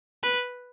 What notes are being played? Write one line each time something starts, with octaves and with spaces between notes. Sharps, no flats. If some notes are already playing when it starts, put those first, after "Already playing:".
B4